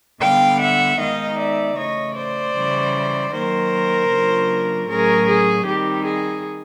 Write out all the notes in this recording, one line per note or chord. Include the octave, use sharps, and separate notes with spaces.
D3 G3 B3 F5 G5
E5 F#5
D#3 G#3 B3 D#4 D#5 F5
D5 E5
C#3 E3 A3 C#5 D#5
C5 D5
C#3 E3 G3
D#3 F#3 A#3 A#4 C5
C#3 F#3 A#3 D4 F4
A2 F#3 A3 C#4 G#4 A#4
G#4
D#3 G3 C4 D#4 G4
G#4